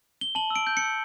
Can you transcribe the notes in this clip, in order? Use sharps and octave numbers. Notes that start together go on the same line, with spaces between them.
G7
A5 F#7
E6
D7
G6
C#7
E6